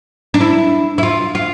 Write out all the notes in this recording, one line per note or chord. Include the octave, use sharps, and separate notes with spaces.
D4
E4
E4
F4
F4